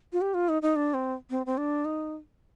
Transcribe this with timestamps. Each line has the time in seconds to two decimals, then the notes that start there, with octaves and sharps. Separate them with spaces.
0.13 F4
0.21 G4
0.34 F4
0.49 D#4
0.62 D#4
0.76 D4
0.94 C4
1.30 C4
1.46 C4
1.58 D4
1.85 D#4